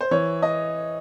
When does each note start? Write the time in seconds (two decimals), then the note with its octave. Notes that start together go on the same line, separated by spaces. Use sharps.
0.01 C5
0.11 E3 C#5
0.42 D#5